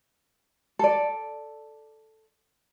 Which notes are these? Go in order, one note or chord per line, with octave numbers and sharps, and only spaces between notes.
A4 D5